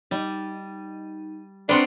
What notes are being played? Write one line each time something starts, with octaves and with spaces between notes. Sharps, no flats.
G3 D#4
B3 C4 D4 D5 F#5 A#5 C6